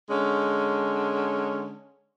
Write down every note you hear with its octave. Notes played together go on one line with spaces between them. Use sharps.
D3 G#3 C#4